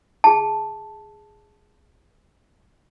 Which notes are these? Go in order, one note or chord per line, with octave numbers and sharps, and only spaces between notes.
G#4 A5